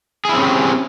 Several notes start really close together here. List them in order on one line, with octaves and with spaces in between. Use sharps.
G#4 E4 C4 C#4 G4